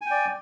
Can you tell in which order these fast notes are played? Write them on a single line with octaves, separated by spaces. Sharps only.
G#5 G5 D5